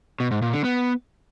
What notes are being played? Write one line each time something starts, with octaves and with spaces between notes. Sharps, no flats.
B2
G#2
A#2
D3
B3